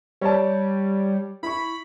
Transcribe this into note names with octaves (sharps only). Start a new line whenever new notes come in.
G3 C#5 D5 A5
E4 B5 C#6